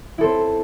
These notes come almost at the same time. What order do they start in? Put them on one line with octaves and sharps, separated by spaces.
E4 A4 C4